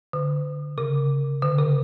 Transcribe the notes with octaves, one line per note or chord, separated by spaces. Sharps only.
D3
C#3
D3
C#3